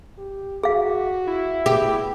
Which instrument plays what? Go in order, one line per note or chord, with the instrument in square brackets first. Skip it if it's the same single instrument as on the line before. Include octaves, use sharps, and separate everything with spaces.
[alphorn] G4
[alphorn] F#4 [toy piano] G#4 F5
[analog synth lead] E4
[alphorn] B3 [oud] G4 [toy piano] G#4